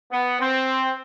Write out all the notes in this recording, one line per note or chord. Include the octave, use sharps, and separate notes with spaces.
B3
C4